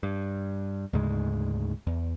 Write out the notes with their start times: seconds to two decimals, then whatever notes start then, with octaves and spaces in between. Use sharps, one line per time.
0.03 G2
0.93 D2 G#2 C#3 G#3
1.87 E2